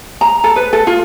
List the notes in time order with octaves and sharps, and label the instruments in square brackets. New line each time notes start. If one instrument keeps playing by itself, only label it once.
[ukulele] A#5
A4
B4
A4
F4